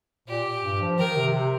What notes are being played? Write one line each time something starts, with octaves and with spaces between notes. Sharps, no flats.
A#2 G4
G2
F3
D#3 A#4
C3
C3